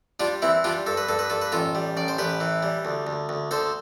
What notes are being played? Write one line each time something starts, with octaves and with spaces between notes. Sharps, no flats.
G3 D4 F4
E3 C4 E4
G3 D4 F4
G2 A4
B4
G2 A4
B4
G2 A4
B4
A1 F4 A4
G3
A1 D5
C5
A1 G4 B4
E3
G3
D2
D2
D2
D2 A4 C5